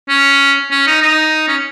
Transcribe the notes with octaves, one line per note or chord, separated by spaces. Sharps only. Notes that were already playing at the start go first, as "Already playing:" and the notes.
C#4
C#4
D#4
D#4
C#4